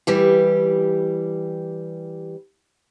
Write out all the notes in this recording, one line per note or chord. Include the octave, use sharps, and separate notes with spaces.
E3 G3 G4